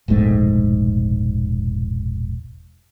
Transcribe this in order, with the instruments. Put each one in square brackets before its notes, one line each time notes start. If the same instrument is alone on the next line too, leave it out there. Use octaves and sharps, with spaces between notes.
[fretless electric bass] E1 A#1 G#2 A3